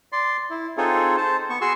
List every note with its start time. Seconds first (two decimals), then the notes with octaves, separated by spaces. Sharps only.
0.12 D5 C6
0.50 E4
0.78 C4 D#4 F4 G#4 A4 C#5
1.17 C5 A5
1.50 B3 C#6
1.61 F#4 G#4 C6 C#6 E6